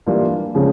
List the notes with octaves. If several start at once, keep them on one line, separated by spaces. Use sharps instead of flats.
E3 G3 A#3 D4 F4
C#3 F3 G#3 C#4